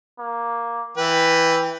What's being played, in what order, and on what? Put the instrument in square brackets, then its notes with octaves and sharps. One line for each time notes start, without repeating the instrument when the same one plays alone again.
[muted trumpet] A#3
[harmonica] E3 B4 [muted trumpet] G5